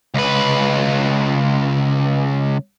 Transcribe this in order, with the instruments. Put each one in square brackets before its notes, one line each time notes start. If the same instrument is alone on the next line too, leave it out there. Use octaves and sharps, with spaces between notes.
[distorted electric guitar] C#2 B4